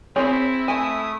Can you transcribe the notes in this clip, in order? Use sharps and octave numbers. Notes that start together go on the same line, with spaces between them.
C4 E4 G#4 C#5
A3 G#5 D#6